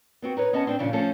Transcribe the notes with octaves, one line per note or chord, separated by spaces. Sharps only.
B3 C4 F#4
D#4 B4 C#5
B3 C#4 D#5 A5
C4 D4
A#2 C#3 F3 C#4 D4
F3 A3 C#4 A4